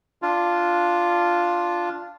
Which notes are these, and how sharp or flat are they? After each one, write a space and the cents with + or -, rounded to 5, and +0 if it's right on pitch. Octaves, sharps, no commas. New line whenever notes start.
D4 +0 F4 +0